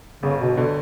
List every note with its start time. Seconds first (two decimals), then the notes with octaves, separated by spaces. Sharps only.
0.23 G1 C#3
0.41 B2
0.57 B2 D3